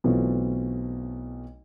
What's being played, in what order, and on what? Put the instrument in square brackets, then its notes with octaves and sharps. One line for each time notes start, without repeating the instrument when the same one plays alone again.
[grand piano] B1 B2 E3 A3 C4 F4